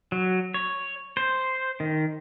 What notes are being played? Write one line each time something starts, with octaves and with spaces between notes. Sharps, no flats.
F#3
C#5
C5
D#3